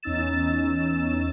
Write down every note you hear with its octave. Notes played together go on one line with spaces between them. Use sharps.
E2 C#4 D#4 E6 A6 E7